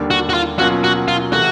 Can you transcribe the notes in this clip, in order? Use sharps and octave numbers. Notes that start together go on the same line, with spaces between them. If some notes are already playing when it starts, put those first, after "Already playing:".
Already playing: D#2 D3 G3 A#3 D4
F#4
F#4
F4
B2 F#3 A#3 C#4 F4 F#4
F#4
F4
C3 E3 A3 F#4